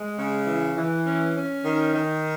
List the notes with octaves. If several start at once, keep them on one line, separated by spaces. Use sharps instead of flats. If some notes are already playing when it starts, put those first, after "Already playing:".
Already playing: G#3
C#3
E3
E3
C#4
C#4
D#3
D#3